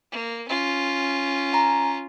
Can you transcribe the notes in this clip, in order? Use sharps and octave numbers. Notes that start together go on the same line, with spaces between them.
A#3
C#4 F4
G#5 A#5